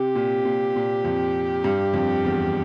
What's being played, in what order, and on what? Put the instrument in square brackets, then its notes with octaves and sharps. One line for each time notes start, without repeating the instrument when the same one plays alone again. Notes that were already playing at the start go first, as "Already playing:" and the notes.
Already playing: [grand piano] C3 [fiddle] G4
[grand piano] A#2
A#2
A#2
F2
G2
F2
E2